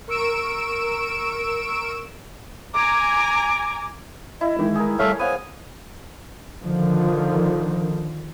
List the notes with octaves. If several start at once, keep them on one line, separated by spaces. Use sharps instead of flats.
A#4 C#6 E6 D7 E7
G#5 A#5 D6
E4 D#5
D#3 E3 G#3
G#4 A#4
G3 A3 C#5 E5 F5
B3 C5 F5 G#5
D3 D#3 F3